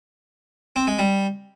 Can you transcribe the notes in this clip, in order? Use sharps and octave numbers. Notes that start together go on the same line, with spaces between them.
C4
G#3
G3